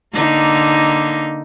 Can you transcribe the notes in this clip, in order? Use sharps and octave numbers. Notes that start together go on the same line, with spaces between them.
D3 A#3 D#4